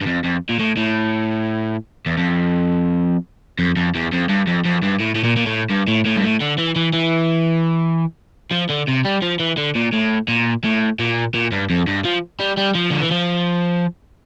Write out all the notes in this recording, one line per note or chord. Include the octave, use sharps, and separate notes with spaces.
G2
F2
F2
A#2
A2
A2
E2
F2
F2
F2
E2
F2
G2
F2
F2
G2
A2
A2
A#2
A#2
A2
G2
A2
A2
G2
A2
D3
E3
E3
E3
F3
D3
C3
G3
F3
E3
D3
A#2
A2
A#2
A2
A#2
A#2
G2
F2
G2
F3
G3
G3
F3
D3
E3
F3